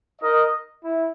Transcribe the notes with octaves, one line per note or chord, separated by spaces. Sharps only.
D#4 A#4 D#5
E4